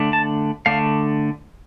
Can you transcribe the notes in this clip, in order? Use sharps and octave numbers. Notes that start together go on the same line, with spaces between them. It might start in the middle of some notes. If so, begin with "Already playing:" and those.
Already playing: D3 A3 D4
A5
D3 A3 D4 F5